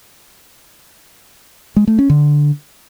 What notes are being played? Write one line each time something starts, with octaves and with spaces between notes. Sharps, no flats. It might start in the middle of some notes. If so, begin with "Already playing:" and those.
G#3
A3
C#4
D3